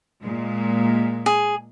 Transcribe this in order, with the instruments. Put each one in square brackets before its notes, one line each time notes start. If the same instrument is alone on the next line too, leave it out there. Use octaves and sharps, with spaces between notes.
[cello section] A#2 G#3
[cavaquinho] G#4